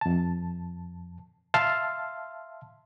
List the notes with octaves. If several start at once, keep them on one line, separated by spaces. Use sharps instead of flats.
F2 A5
E5 F5 A5 C6 F6